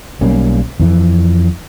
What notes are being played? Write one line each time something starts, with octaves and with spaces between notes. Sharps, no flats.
B1 G3 A#3 C#4
F2 E3